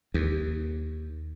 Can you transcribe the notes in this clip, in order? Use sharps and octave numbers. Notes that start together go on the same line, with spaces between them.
D#2